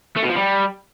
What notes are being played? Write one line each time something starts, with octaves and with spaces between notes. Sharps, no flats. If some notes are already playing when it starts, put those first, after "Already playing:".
A3
B2
F3
G3